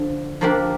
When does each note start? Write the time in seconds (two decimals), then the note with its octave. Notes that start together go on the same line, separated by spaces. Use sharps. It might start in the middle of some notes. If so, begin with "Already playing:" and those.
Already playing: D3 F3
0.41 F3 A#3 D4 G4